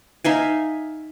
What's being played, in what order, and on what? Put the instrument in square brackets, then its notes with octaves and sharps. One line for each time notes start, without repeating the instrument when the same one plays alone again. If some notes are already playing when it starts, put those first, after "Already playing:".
[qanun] D#4 E5 F5 G#5